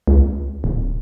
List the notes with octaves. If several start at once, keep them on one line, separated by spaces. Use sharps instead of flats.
C#2
D1